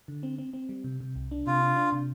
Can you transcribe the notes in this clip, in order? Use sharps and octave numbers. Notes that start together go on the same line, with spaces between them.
D3
C4
C4
C4
G3
C3
C3
C2
D4
C3 F4
D4
D4
C3